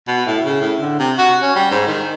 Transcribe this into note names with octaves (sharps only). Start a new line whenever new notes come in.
B2
A2
C#3
A2
D3
C3
F#4
C#4
G3
G#2
D#3